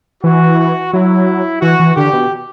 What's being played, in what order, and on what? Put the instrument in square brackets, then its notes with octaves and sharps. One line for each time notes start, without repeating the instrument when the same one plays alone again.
[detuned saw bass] E3 [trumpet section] F#4
[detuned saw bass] F#3 [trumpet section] E4
[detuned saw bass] E3 [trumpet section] F#4
[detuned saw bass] E3
[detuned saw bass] D3 [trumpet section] G4
[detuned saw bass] B2